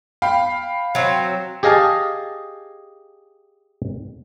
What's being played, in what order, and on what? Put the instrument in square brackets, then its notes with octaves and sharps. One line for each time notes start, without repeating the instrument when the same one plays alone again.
[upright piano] F5 G5 B5
[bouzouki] F#3 C4
[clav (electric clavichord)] G4 G#4 D#5 F5 G#5 A5